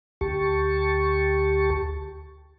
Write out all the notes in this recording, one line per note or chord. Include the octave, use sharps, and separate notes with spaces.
D2 G4 A5 C#6